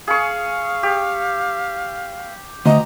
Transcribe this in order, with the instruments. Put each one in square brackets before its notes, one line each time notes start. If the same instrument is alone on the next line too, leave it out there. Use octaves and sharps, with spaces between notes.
[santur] G#4 C#6 [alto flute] F5
[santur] G4
[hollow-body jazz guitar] D2 [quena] D#5 [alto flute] A#5